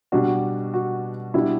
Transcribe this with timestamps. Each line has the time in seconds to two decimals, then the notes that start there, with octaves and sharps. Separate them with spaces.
0.12 B2 G3 D4 F#4
0.74 F#4
1.34 B2 G3 D4 E4